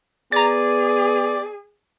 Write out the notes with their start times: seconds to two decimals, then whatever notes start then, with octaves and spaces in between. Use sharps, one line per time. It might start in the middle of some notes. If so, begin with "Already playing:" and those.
0.32 B3 G#4 D5 A#5 A6